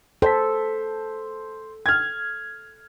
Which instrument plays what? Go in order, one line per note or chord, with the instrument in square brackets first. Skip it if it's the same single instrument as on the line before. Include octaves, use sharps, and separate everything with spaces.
[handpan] A4 [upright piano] C5 B6
[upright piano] F6 G#6